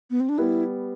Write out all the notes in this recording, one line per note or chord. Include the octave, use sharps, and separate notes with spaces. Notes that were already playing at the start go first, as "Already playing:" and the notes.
B3
C4
D4
G3 B3 E4